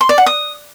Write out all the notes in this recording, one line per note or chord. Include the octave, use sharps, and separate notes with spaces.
C6
D5
F#5
D#6